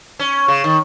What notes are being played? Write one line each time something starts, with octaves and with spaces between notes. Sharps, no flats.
C#4
C#3
D#3